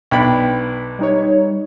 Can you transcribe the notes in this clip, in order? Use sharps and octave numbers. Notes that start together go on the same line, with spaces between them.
B1 D4 G5 B5
G3 D#4 C#5